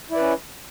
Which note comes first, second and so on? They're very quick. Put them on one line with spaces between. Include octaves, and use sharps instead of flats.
E4 D5 B4 C#4